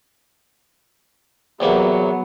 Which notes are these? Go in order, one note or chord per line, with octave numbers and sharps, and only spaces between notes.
E2 C3 F#3 A#3 B3